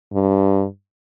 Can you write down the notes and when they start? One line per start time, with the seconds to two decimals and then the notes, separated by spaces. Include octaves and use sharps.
0.13 G2